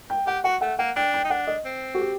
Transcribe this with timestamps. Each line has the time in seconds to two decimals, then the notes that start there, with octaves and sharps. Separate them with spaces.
0.10 G5
0.27 G4 F#5
0.44 F#4 F#5
0.61 A3 F#5
0.79 A#3 F#5
0.96 D4 G5
1.14 G5
1.24 D#4
1.30 D4 F#5
1.47 D#5
1.65 C4
1.94 F#4
1.99 G4